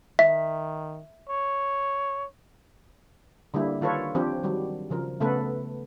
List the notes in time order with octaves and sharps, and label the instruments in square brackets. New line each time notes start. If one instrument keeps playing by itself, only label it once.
[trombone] D#3 [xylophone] E5
[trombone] C#5
[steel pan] D3 G3 A#3 E4
D#3 F4 A4 B4 C#5
F3 C4 D4 G4
D#3 F#3 G3
C#3 F3 A#4
C#3 A3 B3 A4 B4